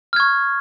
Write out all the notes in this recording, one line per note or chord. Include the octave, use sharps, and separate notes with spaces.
C#6 F6 G#6